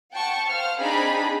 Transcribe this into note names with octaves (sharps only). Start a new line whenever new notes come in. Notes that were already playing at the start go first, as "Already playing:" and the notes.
F#5 G5 A5 C#6
C5 F5 F6
C4 D4 D#4 G#4 D5 B5